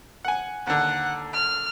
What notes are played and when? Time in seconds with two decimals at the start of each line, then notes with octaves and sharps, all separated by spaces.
0.25 F#5 G#5
0.67 D#2 D3 F#5
1.33 F6